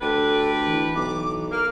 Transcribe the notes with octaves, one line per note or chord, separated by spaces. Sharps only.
D2 D4 G4 A4 B4
E3
B1 D6
A#3 F6